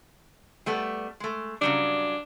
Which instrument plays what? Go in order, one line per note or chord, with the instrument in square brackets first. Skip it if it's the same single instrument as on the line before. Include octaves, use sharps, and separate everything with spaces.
[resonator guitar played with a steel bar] G3 A3 B3
G#3 A3
[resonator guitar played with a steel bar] C#3 F#3 G3 [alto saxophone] D4